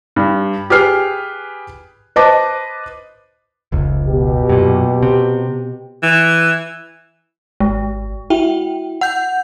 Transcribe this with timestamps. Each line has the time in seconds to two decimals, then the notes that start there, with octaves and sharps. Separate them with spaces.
0.16 G2
0.70 G4 G#4 B4 F6 C7
2.16 B4 C5 D#5 A5 D6
3.72 F1 C#2
4.07 B2 G4
4.49 F#2 A#2
5.03 C3
6.03 E3
7.60 G#1 G#3
8.30 E4 F#4 G5
9.01 F#5 G6